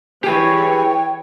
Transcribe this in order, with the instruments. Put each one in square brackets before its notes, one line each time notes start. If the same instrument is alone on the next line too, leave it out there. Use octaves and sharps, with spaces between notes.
[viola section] E3 C#5 [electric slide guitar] G4 G#4 B4 [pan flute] G5